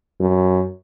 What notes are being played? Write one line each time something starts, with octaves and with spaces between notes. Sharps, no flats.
F#2